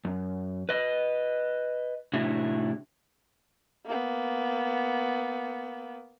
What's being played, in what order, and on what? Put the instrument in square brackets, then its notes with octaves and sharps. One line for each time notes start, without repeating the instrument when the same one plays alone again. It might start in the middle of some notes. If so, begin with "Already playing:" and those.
[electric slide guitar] F#2
B4 D#5
A2 C3 D4 E4 F#4 G#4
[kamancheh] A#3 B3